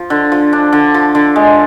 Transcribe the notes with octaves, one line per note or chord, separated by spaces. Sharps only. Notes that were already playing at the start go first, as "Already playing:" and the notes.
Already playing: F3
D3
F3
D4
D3
F3
D3
G#3